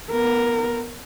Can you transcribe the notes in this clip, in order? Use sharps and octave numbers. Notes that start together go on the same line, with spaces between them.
B3 A#4